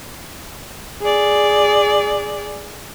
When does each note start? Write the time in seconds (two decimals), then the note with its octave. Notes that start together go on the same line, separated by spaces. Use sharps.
1.02 G#4 D5